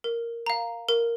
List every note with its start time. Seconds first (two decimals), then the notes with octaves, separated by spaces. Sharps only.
0.04 A#4
0.46 F5 A#5
0.89 A#4